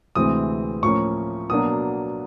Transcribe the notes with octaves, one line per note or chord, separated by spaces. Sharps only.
D2 C3 E3 G#3 C4 D#6
A2 F3 A#3 C#4 C#6
B2 F#3 A#3 D4 D#6